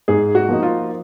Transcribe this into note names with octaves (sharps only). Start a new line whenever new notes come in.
G#2 G#4
F#4
F3 A#3 D#4
F4